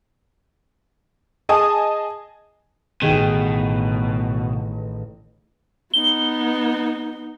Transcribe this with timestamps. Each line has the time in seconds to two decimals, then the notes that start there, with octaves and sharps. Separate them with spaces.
1.49 G#4 D#5 G#5 A5 D#6
3.02 A1 B2 D#3 G#4
5.94 B3 D#4 G7